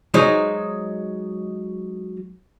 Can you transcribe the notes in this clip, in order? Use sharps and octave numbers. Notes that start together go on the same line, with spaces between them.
F#3 G#3 D#4 C5